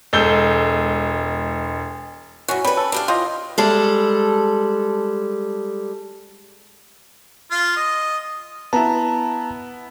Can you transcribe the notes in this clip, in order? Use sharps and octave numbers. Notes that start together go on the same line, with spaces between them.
E1 G#3 A4 E6 G6 G7
F#2 E3 C#4 F#4
G3 C#4 B4
A4
D4 G4 F5
E3 F4 G4 D#5
G3 G#3 A4
F4
D#5
B3 E4 A5 A#5